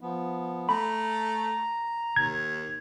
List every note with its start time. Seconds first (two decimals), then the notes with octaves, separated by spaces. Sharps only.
0.01 F3 B3
0.69 A3 A#5 B5
2.16 D#2 G#6